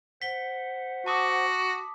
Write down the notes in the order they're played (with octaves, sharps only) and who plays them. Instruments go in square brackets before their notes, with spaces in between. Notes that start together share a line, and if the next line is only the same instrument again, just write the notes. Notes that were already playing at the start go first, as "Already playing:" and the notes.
[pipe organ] C5 F#5 [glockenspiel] B6 G7
[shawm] F#4 [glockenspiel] A5 D6 D#6